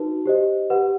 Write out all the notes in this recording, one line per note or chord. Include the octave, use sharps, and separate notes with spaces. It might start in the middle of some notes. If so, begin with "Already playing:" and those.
Already playing: D#4 F#4 B4
G4 C5 D#5
G4 B4 F#5